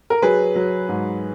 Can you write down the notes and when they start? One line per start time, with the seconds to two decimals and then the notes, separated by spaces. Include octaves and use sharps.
0.10 A#4
0.22 F#3 G#4 B4
0.55 F#3
0.89 G#2